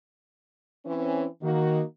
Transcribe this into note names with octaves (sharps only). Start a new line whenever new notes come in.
E3 C4 C#4
D#3 A#3 D#4 F#4